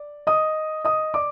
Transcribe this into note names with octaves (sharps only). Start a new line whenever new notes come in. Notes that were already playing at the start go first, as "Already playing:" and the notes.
Already playing: D5
D#5 D#6
D#5 D#6
D5 D6